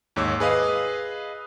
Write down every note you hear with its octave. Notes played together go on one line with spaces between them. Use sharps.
D#2 G#2 C#5 D6 E6
G#4 B4 D#5 F5 D#6